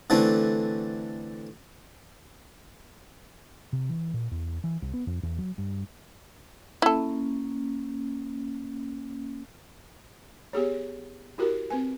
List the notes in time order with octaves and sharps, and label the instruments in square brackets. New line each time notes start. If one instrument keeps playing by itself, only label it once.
[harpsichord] D3 E3 A3 C4
[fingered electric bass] C3
E3
A#2
E2
E3
C2
B3
F2
E2
F#3
G2
[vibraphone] A#3 C#4 [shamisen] E4 A4
[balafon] B3 G4 G#4 C#5
E4 F#4 G4 A#4
C4 B4 G#5